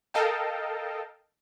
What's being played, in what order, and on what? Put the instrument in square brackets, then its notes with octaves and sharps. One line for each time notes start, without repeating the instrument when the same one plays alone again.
[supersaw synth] A4 A#4 D#5 F5 G5 A5